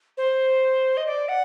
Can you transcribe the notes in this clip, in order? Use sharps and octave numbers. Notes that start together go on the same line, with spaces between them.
C5
D#5
D5
F#5